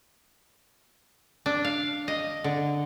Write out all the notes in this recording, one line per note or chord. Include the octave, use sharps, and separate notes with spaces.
D4
F5
D#5
D3